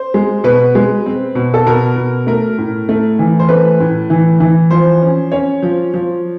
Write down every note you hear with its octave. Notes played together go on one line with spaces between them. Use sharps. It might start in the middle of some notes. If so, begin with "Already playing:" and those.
Already playing: C5
G#3
B2 B4
G#3
C4
B2
A4
B2 A#4
B2
A3 A#4
A2
A3
E3
C5
A3 B4
A2
E3
E3
F3 C5
C#4
C#4 C#5
F3
F3